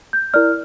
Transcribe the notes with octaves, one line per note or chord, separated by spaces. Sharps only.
G6
E4 A#4 D5 F6